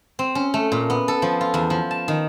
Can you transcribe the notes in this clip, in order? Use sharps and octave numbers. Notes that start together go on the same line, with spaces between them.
C4
C#4
A3
A#2
B3
A4
F3
F4
E2
F3
A5
D#3